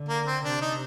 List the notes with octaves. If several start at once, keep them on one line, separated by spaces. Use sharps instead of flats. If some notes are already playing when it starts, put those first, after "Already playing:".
Already playing: D3
A#3
C4
C3 D4
D#4